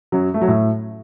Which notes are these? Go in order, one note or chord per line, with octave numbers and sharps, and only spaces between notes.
F#2 F#3
A3
F#3
A2 A3